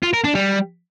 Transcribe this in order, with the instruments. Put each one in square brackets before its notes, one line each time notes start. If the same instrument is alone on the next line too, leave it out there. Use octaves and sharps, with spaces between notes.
[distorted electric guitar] F4
A#4
D4
G3